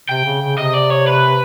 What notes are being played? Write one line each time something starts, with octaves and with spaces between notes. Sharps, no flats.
C3 G5
C#3
C#3
C3 D#5
D5
C#5
B4